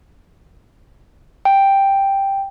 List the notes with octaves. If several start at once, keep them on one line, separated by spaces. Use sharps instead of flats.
G5